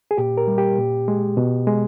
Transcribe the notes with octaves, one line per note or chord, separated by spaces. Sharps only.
G#4
A#2 G4
A#4
G3
G4
A#2
G#3
B2
G#3